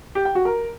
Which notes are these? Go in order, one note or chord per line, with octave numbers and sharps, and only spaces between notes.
G4
G5
F#4
A#4